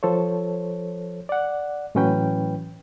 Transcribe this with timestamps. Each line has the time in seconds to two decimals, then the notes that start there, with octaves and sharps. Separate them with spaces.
0.03 F3 A4 C5 C#5
1.29 D5 F#5
1.95 A2 E3 F#3 C#4 B4 G5